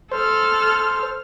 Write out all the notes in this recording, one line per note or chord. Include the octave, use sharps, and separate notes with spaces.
A4 C5 F6